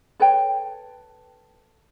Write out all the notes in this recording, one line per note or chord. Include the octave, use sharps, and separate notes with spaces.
A4 B4 C#5 G5